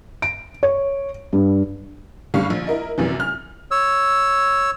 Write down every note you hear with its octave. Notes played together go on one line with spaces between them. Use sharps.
D7
C#5
G2
F#1 D3 G3 F5 C#6
A#1
E4 A#4 D#5
A#1 F#2 C3 E3
F6
C#5 E6